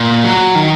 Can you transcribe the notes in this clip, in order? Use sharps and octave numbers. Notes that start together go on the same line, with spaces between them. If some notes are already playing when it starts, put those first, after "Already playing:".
Already playing: A#2
F#3
D#3